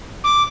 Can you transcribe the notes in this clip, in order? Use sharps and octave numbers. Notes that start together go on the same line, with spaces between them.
D6